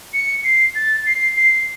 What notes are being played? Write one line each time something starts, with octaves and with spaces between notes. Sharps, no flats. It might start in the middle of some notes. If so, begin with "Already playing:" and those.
C#7
C7
A6
C7
C7